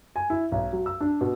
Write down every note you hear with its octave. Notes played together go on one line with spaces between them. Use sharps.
G#5
E4
B1
F#3
E6
D4
B2